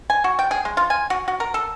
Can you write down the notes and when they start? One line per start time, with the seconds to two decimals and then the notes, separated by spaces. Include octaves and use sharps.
0.10 G#5
0.24 F#4
0.39 G5
0.51 G#4
0.65 G#3
0.77 F4
0.90 G#5
1.10 F#4
1.28 F#4
1.40 A#4
1.54 A4